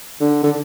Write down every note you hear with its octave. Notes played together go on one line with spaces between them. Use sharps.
D3
D3